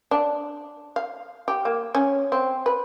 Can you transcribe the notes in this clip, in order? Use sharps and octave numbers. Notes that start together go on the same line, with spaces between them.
D4
F5
G4
A#3
C#4
C4
B4